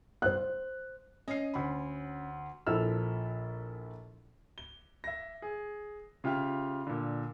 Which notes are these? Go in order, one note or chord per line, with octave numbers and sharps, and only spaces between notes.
C5 F#6
C#4 D#5 C7
D2 B5
A#1 F3 E4 A4 E6 F6
G7
E5 A#6
G#4
C#3 F4 G4 E5 F6
A#2 D3